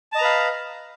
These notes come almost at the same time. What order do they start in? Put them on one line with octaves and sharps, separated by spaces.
A5 D#5 A#5 B4 F5